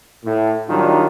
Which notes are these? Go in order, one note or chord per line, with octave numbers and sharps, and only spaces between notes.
A2
D#3 F#3 G3 D4 D#4 F4